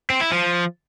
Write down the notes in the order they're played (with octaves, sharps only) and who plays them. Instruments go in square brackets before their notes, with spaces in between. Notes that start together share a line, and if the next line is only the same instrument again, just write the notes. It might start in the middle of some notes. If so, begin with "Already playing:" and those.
[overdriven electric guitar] C4
E4
F3